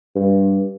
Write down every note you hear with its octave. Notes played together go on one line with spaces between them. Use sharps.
G2